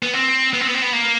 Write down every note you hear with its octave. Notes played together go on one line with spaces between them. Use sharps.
B3
C4
B3
C4
B3
C4
B3
A#3